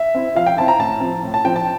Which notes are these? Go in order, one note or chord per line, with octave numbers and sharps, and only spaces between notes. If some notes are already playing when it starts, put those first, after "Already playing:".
Already playing: E5
C4 E4
F3 F5
G5
C4 E4 A5
A#5
A2 A5
F3 C4
A2
A5
F3 C4 G5
A5